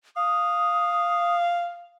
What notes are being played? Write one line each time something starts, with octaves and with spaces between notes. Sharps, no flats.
F5 D#6